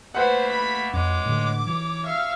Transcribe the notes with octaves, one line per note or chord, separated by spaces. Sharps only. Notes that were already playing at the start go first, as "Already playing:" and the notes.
A3 A#3 B4 C5 F#5 B5
B5 B6
F2 G#3 C#5 D6
A2 D3
E3 C#5
E5 F5 C#6